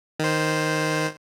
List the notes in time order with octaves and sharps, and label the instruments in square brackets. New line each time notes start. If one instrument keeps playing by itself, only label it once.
[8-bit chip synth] D#3 C5